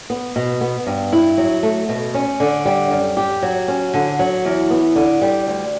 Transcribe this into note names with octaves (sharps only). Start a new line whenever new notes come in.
B3
B2
B3
G2
E4
F#3
A3
B2
C#4
D3
G3
F#2
G4
F#3
C#4
D3
F#3
E2
B3
D3
G3
D2